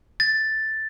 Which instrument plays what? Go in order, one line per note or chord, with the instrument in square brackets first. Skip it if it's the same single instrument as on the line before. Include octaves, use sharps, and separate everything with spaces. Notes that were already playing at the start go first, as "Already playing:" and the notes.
[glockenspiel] A6